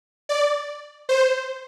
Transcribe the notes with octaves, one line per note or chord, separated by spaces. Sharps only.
D5
C5